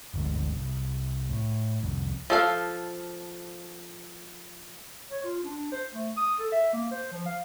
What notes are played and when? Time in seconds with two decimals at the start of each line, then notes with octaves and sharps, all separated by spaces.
0.14 G1 D2 G#2
0.56 C2
1.29 A2
1.83 C2 F2
2.30 F3 A4 F5
5.11 C#5
5.24 F4
5.44 D4
5.72 C5
5.93 A3
6.17 D#6
6.39 A4
6.52 E5
6.73 A#3
6.91 C5
7.12 F3
7.26 F5